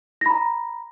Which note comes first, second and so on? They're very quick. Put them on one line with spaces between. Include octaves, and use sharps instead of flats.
A#6 B5 A#5